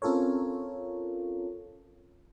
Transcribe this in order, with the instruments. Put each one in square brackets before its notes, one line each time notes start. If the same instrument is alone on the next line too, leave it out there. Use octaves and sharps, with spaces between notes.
[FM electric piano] C4 C#4 F4 A4 A#4 C#5